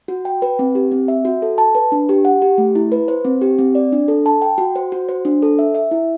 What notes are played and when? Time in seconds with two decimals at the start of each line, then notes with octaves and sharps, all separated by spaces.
0.08 F#4
0.25 G5
0.42 B4
0.59 C4
0.75 G4
0.92 C4
1.08 E5
1.25 F#4
1.42 A4
1.58 A5
1.75 B4
1.92 D4
2.09 G4
2.25 F#5
2.42 G4
2.58 A3
2.75 E4
2.92 B4
3.08 C5
3.25 C4
3.41 G4
3.59 C4
3.75 D5
3.92 D4
4.08 A4
4.26 A5
4.42 G5
4.58 F#4
4.76 C5
4.92 F#4
5.09 C5
5.25 D4
5.42 A4
5.59 E5
5.74 E5
5.91 E4